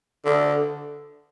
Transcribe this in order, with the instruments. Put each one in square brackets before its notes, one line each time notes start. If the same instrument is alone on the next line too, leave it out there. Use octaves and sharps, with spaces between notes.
[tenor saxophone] D3